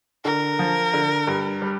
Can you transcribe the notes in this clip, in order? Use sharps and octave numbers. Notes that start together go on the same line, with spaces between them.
D3 A#4
F3
D3
G2
G3